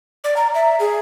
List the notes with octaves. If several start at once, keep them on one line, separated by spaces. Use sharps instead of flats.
D5
A#5
E5
G#4